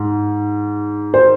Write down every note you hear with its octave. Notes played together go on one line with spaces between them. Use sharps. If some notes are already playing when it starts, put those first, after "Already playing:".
Already playing: G#2
C5